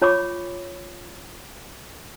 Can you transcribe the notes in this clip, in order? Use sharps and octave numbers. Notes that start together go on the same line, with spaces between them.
F4 C#5 B5 C#6 D6